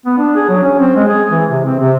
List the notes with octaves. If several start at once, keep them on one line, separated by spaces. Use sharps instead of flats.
B3
D4
G#4
F#3
C#4
C4
G#3
G#4
E3
C3
C4
C3